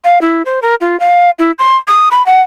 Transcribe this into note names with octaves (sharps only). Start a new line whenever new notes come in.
F5
E4
C5
A#4
F4
F5
E4
C6
D#6
B5
F#5